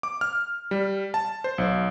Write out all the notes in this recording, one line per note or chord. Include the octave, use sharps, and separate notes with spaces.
D6
F6
G3
A5
C5
B1